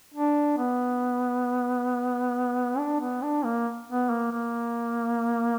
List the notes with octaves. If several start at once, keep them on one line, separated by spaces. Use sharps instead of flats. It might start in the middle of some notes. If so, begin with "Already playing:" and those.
D4
B3
D4
B3
D4
A#3
B3
A#3
A#3